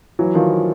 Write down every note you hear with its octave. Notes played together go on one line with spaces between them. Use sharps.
E3 F#3
D#3 F3